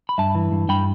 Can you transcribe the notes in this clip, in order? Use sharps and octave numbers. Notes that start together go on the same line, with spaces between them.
B5
G2 E5 A5
E3
G2
G2 G5 B5